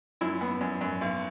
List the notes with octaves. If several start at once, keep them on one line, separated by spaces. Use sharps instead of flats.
F#2 E4
B3
F#2
F#2
B1